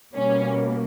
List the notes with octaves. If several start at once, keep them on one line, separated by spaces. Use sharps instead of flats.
B2 G3 A#3 C#4